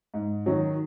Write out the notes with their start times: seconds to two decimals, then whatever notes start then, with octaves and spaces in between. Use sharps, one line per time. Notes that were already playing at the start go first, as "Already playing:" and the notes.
0.14 G#2
0.46 D#3 F#3